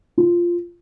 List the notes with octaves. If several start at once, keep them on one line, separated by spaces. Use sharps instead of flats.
F4